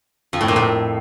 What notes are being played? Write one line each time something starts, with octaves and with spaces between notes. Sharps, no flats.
F2
A2
A#2
A2